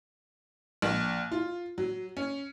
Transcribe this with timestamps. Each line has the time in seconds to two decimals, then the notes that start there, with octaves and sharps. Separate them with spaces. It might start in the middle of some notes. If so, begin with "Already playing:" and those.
0.82 A#1
1.31 F4
1.78 F#3
2.17 C#4